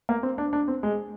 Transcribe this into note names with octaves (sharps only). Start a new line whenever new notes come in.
A#3
C4
D4
D4
C4
G#3